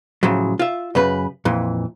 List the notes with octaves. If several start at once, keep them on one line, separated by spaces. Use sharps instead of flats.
A2 C#3 F3 F#3
F4 E5
F#2 C#3 B4
F2 A#2 E3